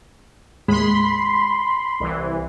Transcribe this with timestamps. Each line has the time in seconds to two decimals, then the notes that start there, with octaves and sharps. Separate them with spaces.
0.68 D#2 A2 G#3 B5 C6
2.00 C2 E3